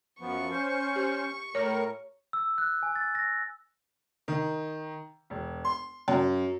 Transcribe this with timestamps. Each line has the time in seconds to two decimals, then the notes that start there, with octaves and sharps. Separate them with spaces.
0.21 F#2 F3 B3 C#6
0.51 C#4 C5
0.96 G4
1.55 A2 A#4 C#5
2.33 E6
2.58 F#6
2.83 G#5
2.96 A6
3.15 A#6
4.28 D#3
5.30 E1
5.65 C6
6.08 F#2